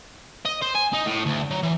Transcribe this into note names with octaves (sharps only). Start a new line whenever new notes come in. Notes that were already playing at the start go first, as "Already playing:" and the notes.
D#5
C5
G#5
D#4
A2
D2
F#3
E3